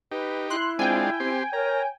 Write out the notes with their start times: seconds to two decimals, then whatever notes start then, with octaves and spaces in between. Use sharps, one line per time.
0.12 D#4 G4 B4
0.50 E4 C6 F#6
0.79 G#3 C4 D4 F4 G5 G#5
1.20 C4 G4 C6
1.53 A#4 C#5 A#5